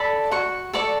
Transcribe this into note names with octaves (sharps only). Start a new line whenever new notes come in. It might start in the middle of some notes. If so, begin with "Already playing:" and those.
Already playing: A4 D5 B5
F#4 C#6
A4 D5 C#6